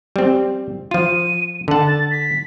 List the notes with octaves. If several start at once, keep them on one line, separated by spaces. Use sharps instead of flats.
G3 C4
F3 F4 D#7
D3 F#5 A5
A6
B6